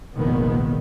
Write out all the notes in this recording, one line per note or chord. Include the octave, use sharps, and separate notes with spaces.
F1 A#1 A#2 D#3 G#3 B3